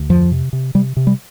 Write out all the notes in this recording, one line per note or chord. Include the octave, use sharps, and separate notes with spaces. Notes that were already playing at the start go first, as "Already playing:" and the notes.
Already playing: D2
F2 F3
C3
C3
C3 G3
C3
G3